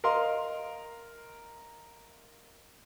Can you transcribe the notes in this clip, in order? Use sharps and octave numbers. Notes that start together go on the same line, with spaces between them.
A#4 D#5 F5 C6